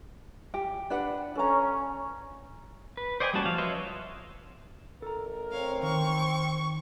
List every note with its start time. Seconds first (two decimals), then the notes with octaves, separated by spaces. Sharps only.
0.54 G4
0.90 D4 B4 F#5
1.35 C#4 A4 A#5
2.97 B4
3.20 C5 D5 D#5 G5 G#5
3.33 G3 A#3 C#4 F#4 A5
3.46 F3 F5
3.58 B4 C#5 D#5 E5 C6
5.02 A1 A4 A#4 A#5
5.52 C4 C#5 F5
5.83 D#3 C#6